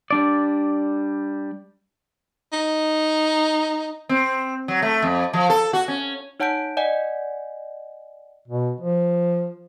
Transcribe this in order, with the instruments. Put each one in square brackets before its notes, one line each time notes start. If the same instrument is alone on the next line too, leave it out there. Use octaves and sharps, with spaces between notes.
[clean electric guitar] G3 D4 D5
[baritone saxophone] D#4
[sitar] C4
F#3
A3
F2
F3
A4
F#4
C#4
[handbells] D#4 C#5 F#5 A5 G6 D7
D5 D#5 F#5 G#5
[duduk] B2
F3